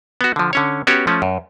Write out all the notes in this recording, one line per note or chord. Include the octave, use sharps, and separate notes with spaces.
B3 F#4
D3 F3
D3 C#4 C#5
B3 C#4 F#4 G4 C#5
F3 A3 C#4
F#2